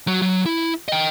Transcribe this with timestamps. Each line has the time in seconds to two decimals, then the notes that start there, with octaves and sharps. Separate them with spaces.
0.07 F#3 F#4
0.22 F#3
0.46 E4
0.88 D#5 G5